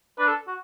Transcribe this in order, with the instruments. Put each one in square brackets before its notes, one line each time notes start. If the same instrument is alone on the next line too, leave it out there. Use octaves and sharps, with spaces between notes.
[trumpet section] D4 [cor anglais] B4
[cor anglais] A4
F#4